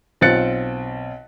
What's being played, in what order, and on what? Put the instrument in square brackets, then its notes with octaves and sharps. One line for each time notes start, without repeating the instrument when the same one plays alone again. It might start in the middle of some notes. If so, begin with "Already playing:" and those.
[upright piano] B1 C4 F4 F#6 A6 C#7